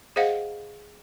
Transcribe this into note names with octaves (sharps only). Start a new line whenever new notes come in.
G#4 C5 D#5 F5 F#5